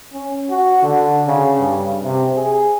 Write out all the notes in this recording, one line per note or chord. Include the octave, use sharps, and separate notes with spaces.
C#4
F#4
D3
C#3
G2
C3
G#4